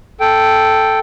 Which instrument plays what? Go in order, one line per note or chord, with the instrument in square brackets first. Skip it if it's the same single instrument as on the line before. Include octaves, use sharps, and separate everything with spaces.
[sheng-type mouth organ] A4 G5